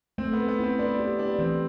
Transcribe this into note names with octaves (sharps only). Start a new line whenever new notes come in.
A3 C4
B3
B4
B3
C4 E4
D4 B4
C4 G4
D4 G4
E3 C4